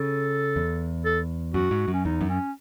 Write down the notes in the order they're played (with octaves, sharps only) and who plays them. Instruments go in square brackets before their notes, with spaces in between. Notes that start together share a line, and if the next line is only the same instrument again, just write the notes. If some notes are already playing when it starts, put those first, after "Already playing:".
Already playing: [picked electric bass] C#3 [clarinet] A4
[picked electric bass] E2
[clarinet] A4
[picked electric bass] F#2 [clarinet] F#4
[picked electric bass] G#2
F#2
[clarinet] C#4
[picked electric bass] E2 [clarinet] D#4
[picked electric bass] F#2
[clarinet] C#4